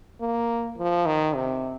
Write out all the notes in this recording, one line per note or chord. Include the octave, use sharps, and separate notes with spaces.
A#3
F3
D#3
C3